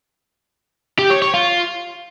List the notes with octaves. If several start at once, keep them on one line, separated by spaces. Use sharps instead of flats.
G4
C#5
C#5
F4